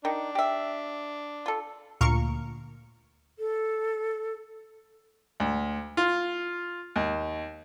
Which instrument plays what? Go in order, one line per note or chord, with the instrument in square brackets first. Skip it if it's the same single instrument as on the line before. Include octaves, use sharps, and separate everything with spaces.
[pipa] D#3 [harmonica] D4
[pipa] G4 E5
F4 A4
[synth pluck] D2 A#2 A#4 F5 C#6 C#7
[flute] A4
[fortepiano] D2
F4
D#2